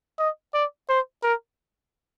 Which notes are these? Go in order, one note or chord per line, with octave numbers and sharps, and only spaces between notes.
D#5
D5
C5
A#4